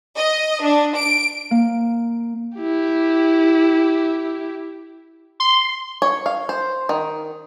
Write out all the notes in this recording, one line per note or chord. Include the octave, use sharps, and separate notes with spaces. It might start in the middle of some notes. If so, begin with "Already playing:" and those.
D#5
D4
D7
A#3
E4 G4
C6
C#5
F5
C5
D#3